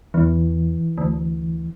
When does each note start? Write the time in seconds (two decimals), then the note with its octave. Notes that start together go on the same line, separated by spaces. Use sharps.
0.14 E2 E3
0.98 D2